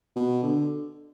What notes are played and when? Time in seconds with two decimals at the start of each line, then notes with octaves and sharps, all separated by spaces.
0.16 B2
0.42 D3